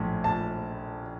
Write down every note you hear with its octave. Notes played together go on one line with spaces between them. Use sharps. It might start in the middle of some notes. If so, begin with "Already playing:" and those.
Already playing: A#1 A2
A5